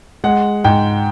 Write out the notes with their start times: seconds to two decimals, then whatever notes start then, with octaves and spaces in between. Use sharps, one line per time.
0.24 G#3 F#5
0.64 G#2 G5